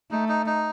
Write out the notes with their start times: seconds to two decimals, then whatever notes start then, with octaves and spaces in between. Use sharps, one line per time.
0.11 A3 D#4
0.29 D#4
0.46 D#4